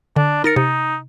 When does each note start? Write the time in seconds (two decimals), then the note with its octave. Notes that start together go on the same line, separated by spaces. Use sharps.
0.16 D3 D4
0.44 D#4 A#4 A6 C#7
0.56 C3 D#4